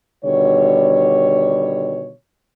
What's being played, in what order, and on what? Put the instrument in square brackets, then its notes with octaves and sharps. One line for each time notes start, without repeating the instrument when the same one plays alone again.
[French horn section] B2 D3 D#3 G3 C#5